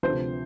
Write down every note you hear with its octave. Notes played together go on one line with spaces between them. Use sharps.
D2 C3 F3 C5